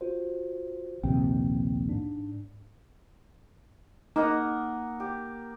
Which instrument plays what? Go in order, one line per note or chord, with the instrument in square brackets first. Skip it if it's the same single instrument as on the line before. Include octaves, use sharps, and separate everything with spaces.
[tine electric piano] F4 F#4 C5
[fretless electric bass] A#1 D#2 C3 [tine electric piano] G5
[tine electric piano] G#2 D4
[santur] A#3 F#5 D#6 [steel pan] D#4
[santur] G4